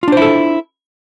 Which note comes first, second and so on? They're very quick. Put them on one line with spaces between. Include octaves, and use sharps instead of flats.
F4 D4 C5 E4 A4